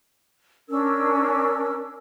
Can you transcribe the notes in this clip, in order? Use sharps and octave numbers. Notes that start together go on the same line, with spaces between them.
C#4 D4 A#4 E6